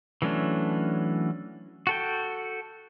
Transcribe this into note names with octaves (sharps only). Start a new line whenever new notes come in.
E3 F#3 A3 C#4 D4
F#4 A4 G5